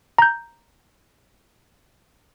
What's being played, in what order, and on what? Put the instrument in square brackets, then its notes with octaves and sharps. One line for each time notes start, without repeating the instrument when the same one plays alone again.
[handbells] A#5 G6